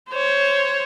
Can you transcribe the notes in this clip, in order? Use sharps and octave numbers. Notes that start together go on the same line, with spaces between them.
C5 C#5